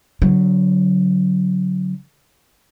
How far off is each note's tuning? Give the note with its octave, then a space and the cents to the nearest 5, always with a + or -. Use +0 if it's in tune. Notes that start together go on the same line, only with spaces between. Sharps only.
D3 -30 F#3 +0